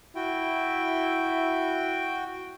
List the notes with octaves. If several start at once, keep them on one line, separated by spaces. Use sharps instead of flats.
E4 F#4 G5